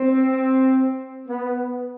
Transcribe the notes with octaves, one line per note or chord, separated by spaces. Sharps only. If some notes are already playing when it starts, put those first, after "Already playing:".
Already playing: C4
B3